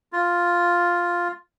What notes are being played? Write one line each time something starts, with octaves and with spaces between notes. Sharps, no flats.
F4